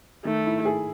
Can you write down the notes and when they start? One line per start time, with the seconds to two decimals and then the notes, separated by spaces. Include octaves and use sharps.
0.25 D#3 A3
0.46 E4
0.65 G#4